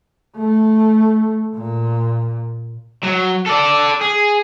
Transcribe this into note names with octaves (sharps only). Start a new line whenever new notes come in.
A3
A#2
F#3
A4 D5
G#4